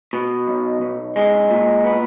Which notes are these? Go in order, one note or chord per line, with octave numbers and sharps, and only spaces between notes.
B2
B1
B1
G#3
A#2
B3